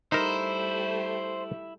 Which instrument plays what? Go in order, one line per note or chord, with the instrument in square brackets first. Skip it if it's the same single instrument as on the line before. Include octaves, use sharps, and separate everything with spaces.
[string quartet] G3 A3 G4 [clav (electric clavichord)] D#4 A#4 [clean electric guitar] E4 [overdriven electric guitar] C5